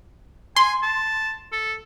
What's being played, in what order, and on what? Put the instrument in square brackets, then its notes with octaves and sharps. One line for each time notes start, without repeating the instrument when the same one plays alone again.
[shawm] G#5 [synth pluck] C6
[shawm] A5
A4